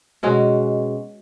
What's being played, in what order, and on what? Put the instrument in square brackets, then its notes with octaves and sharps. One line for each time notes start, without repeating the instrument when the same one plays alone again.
[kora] B2 G#3 C#4 F#4